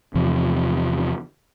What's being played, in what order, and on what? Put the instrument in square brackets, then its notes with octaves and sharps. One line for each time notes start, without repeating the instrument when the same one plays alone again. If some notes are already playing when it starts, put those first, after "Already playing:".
[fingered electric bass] E2 C3 F3